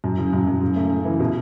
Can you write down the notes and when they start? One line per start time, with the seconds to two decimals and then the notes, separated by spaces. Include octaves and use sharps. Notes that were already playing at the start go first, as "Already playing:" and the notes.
0.04 F#2
0.18 C#3
0.33 F#2
0.47 F#2
0.61 C#3
0.76 A3
0.90 C#3
1.05 E3
1.20 B2